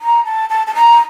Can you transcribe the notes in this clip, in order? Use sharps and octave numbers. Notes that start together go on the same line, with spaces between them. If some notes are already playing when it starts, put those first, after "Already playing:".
A#5
A5
A5
A5
A#5